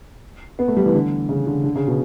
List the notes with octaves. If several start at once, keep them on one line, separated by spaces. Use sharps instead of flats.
B3
A3
G3
E3
D3
C#3
D3
D3
C#3
B2